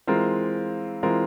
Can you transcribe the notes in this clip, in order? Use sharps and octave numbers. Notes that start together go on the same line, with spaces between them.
E3 G#3 C4 F4 A#4
E3 G#3 C4 F4 A#4